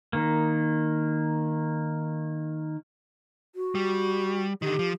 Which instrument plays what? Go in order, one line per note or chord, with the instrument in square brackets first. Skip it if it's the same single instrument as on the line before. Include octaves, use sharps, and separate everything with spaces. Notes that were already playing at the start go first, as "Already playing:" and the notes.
[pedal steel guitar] D#3 A#3
[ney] F#4
[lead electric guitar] G3
[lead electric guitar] D3 D#3 [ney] G4
[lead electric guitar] F3